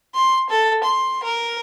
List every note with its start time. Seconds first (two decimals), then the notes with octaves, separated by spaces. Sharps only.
0.15 C6
0.50 A4
0.84 C6
1.24 A#4